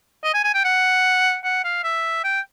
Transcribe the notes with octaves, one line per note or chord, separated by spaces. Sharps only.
D#5
G#5
G#5
G5
F#5
F#5
F5
E5
G5